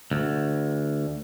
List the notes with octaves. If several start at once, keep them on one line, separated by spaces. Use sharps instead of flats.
D2